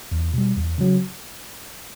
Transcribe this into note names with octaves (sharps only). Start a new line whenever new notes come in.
E2
B2 G3
E2
C#3 F#3